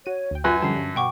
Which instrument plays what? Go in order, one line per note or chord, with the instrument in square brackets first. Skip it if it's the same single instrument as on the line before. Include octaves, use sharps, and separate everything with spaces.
[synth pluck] F#4 D#7 [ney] C#5
[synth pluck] D2 G5
[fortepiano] F#2 G#5 F#6 [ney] F4 [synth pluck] B4
[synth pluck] D3 F3 G3 [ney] C#4 [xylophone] A5 C7
[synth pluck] G2
[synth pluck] B2 [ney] F#5 [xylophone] G5 C#6 D6